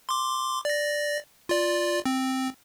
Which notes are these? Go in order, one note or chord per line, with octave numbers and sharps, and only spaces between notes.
C6 D6
D5 A#6
F4 D5
C4